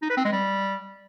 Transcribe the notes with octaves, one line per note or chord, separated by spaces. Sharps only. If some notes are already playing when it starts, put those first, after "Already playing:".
D#4
B4
C4
G#3
G3